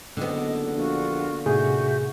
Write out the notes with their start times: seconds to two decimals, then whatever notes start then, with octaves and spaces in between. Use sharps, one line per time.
0.17 F#1 D3 B3 D#5
0.75 A#1 F4 F#4
1.46 D#2 A2 C3 F#4 G#4 E5 G6